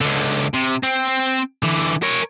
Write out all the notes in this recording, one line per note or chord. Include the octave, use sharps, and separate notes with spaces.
C#2 D3
C3
C4
D3 E3
A#4 C#5